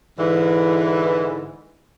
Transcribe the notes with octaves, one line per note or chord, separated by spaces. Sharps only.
G#2 D3 E3